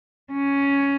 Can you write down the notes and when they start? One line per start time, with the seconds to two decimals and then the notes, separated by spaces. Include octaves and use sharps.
0.32 C#4